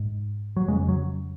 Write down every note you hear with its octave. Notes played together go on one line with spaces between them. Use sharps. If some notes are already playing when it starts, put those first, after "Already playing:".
Already playing: G#2
F#3
F2 C#3 G#3
F#3